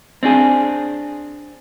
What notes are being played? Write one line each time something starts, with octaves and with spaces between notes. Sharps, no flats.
C4 D4 G#4